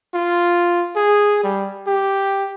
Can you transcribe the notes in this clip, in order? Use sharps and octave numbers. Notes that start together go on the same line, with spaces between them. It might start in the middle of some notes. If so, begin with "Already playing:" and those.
F4
G#4
G3
G4